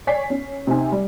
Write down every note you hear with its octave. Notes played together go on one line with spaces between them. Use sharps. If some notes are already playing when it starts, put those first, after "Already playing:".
C#5 D5 G#5 B6 C7
C#4
C3 C4 D#4 G#5
G3